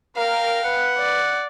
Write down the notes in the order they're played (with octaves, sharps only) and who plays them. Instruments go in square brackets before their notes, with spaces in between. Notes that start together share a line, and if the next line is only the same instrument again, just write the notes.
[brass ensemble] A#4 [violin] F5 G5
[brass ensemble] B4 [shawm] F#5
[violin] D5